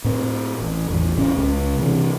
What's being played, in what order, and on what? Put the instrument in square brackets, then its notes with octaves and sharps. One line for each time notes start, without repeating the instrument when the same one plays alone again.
[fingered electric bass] A2 C4
A1
A1 E2 A2
A1 C#3 E3 C#4
C#2
C3 E3